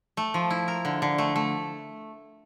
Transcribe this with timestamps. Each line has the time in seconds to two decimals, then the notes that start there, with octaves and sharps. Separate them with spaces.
0.17 A3
0.34 F3
0.50 E4
0.68 A#4
0.85 D3
1.02 D3
1.18 A3
1.36 A3